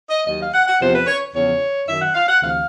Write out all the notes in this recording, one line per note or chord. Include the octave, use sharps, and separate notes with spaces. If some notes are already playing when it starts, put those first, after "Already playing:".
D#5
D#2 D#3 F#3 D#5
F5
F#5
F#5
E2 C3 F3 C5
B4
C#5
E2 C#3 F3 C#5
F#2 D#3 F#3 E5
F#5
F5
F#5
D2 C3 E3 F5